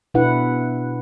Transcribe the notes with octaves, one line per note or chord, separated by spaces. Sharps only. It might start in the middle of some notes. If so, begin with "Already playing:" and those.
B2 D4 E4 B4 F#5